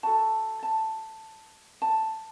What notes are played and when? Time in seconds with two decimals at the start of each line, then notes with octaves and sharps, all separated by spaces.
0.03 F#4 A4 A5
0.63 A5
1.82 A5